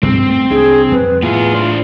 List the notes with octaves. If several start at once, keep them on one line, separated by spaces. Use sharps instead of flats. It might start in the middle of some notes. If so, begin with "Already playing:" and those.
G2 C4
A3
C2 C3 D4 G#4
F2 B4
A2 B3 F4 G#4
D4 C5